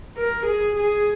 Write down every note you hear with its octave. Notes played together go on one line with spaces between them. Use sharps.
A#4
G#4
G#4